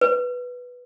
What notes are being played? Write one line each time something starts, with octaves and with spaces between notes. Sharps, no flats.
B4